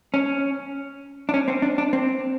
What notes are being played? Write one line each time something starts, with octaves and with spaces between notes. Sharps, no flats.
C#4
D4
C#4
C4
D4
D4
C4